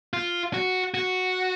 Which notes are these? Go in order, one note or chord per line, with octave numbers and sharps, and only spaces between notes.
F4
F#4
F#4